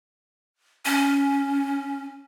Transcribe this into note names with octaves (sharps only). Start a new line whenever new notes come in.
C#4